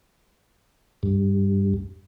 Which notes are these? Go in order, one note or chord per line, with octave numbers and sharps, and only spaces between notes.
G2